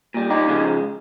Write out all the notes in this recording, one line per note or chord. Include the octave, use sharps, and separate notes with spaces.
A#2 G3
D#4 G4
C#3 F3 G#3